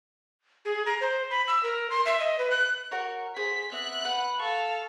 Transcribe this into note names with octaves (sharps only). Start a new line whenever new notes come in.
G#4
A#5
C5
B5
E6
A#4
C6
E5
D#5
B4
F#6
F#4 A#4 C#5
G#4 C5 B6
B3 C4 E5 F#6
B4 F#5
A4 F5 C#6